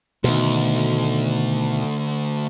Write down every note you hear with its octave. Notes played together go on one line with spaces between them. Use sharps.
D2 B2 D#3